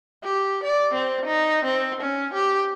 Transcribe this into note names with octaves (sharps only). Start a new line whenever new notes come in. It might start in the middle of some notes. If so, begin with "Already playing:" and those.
G4
D5
C4
D#4
C4
C#4
G4